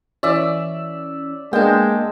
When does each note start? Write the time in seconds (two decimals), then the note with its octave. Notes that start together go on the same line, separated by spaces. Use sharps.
0.23 E3 C#4 D5 E5
1.53 G#3 A#3 B3 D4 G5 A5